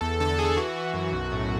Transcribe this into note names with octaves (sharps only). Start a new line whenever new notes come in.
E2 A4
D3 A4
E2 G#4
E3 F#4
E3
F#2
B1
A2